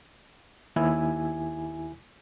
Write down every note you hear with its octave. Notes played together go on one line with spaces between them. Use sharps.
D#2 E4 G#5